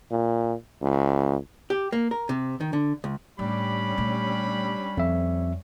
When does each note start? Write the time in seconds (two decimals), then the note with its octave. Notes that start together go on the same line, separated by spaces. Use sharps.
0.11 A#2
0.81 C#2
1.70 G4
1.93 A#3
2.11 A#4
2.29 C3
2.61 D#3
2.73 D3
3.04 C#2
3.39 A2 G3 C#4 D4 G4 B5
3.98 A#2 A3
4.97 F2 F4 E5